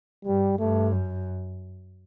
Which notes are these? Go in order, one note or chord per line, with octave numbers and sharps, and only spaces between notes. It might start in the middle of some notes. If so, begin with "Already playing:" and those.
G2 G3
G2 A3
F#2